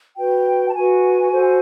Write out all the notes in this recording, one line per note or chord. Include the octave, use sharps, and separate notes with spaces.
F#4 B4 G5
A5
F#4 B4 G#5
F#4 A4 C5